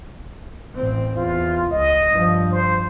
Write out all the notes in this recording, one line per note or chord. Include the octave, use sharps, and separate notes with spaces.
A1 C4
E2 F4
C#2 D#5
G2 F3
C5